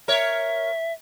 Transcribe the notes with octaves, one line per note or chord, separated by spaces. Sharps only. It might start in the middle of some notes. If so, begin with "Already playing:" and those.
A#4 C#5 E5